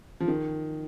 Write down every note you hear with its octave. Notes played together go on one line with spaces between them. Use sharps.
F3
D#3